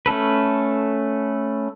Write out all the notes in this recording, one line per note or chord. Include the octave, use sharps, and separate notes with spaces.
A3 C#4 A4 B4